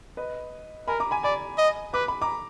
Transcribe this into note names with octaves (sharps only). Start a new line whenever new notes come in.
B4 D#5
A#4 G#5 B5
A#5 D6
G#5 B5
D5 G#5 B5
D#5
B4 D6
B5
A#5 D6